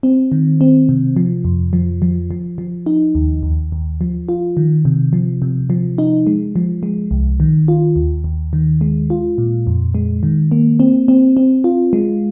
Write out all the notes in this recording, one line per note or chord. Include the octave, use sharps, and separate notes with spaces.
C4
D#3
C4
C3
F3
F2
F3
F3
F3
F3
D#4
D#2
D#2
D#2
F3
F4
D#3
C3
F3
C3
F3
D#4
G#3
F3
G#3
C2
D#3
F4
D#2
D#2
D#3
G#3
F4
A#2
F2
G#3
D#3
A#3
C4
C4
C4
F4
G#3